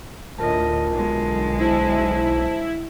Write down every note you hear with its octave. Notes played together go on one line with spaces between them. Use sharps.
D2 A2 F4 A#4 D#5 A5
B1 D3 G#3
E4 C5 A5